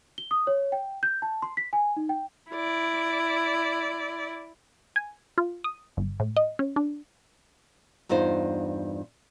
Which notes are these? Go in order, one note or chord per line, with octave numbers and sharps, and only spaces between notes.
G7
D#6
C#5
G5
G6
A5
C6
B6
G#5
D#4
G5
E4 D5
G#5
F4
D#6
G1
A2
D#5
C#4
D4
E2 G2 D#4 F4 C5